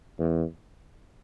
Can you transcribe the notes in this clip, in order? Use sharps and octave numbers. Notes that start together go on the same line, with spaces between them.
E2